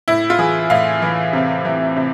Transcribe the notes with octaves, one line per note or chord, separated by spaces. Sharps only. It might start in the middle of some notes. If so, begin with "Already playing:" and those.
A2 E4
F4
E3 G#4
A2 F5
E3
C3
E3
C3